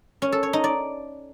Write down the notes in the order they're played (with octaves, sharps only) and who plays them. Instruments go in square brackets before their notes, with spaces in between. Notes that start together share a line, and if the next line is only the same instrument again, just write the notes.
[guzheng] C#4
A4
C#5
D#4
D5